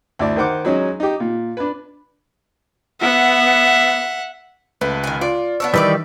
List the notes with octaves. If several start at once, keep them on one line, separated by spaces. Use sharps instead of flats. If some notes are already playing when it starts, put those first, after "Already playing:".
D2 E4 D5
D#3 A#4 C5 F#5 D6
F#3 G#3 C#4 D#4 F#4
D#4 G4
A#2
D4 B4
B3 E5 F#5
C#2 A3 B4
D#3 G#5
F4 D5
B3 D4 C#5 E6
D#3 E3 G3 B4 C#5 D5